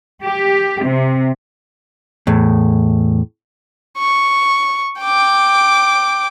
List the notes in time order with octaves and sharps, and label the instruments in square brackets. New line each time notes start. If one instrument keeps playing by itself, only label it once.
[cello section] G4
C3
[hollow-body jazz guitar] E2 A2
[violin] C#6
G5 D6